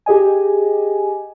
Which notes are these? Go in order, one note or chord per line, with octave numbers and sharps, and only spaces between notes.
G4 G#4 D#5 G#5